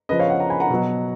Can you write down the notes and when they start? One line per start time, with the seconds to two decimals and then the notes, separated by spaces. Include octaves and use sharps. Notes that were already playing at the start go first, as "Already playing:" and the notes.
0.09 C#3 F3 B4 D#5
0.19 C#5 F5
0.30 D#5 F#5
0.40 F#5 A#5
0.50 G#5 B5
0.60 F#5 A#5
0.70 B2 F#3